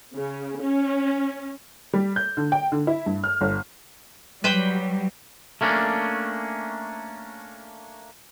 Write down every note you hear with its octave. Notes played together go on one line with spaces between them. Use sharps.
C#3
C#4
G3
G6
D3
G5
D3
E4
G2
F6
G1
F#3 G3 B4 C5 G5
A3 A#3 C#4 D4